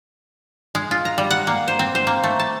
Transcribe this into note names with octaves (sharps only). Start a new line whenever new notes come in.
G#3
F4
A#5
G3
F#5
A#3
C5
C4
C5
A#3
A3
A5